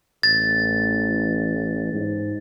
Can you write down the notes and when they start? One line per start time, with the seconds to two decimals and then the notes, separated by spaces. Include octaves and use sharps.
0.23 A1 A6
1.93 G#2